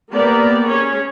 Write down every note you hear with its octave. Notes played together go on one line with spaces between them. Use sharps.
A#3 B3 G4 A#4 D5
C#4 G#4 C#5